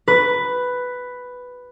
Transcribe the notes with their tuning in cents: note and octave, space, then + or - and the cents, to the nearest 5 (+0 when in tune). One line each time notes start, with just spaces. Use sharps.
B4 +5